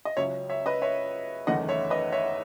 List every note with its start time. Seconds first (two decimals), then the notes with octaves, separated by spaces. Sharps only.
0.05 D#5
0.16 C#2 C#3 F#3 C#4 C#5 E5
0.49 C#5 E5
0.66 B4 D#5
0.82 C#5 E5
1.47 F#1 E2 D#3 A3 C#4 D#5 F#5
1.69 C#5 E5
1.90 B4 D#5
2.12 C#5 E5